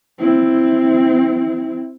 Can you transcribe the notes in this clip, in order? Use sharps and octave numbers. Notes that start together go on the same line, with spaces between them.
C4 E4